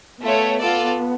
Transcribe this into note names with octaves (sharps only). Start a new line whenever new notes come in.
A3 B3 F4 A4 C#5
F4 A4 D5